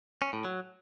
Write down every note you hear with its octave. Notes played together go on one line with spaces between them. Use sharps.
C#4
A2
F#3